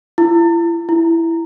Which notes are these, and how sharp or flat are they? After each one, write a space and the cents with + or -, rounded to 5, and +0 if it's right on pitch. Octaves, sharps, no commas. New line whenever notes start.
E4 +40
E4 +10